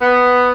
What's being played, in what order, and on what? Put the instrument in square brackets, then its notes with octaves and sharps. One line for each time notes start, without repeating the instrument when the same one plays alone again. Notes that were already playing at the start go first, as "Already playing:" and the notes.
[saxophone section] B3